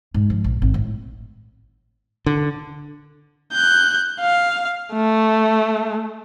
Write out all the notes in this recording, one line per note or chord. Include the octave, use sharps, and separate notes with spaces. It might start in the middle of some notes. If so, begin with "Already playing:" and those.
G#2
F3
A#1
G#1
A2
D3
F#6 G6
F5
A3